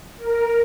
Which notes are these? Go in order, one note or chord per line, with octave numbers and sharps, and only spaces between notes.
A#4